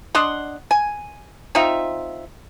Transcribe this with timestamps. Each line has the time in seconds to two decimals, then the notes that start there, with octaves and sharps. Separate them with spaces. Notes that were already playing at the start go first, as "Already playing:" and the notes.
0.15 D4 D#5 F#5 C6
0.71 G#5
1.55 C4 D#4 F4 E5